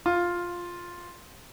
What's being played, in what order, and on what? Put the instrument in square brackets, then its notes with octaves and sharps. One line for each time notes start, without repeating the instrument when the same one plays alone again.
[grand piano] F4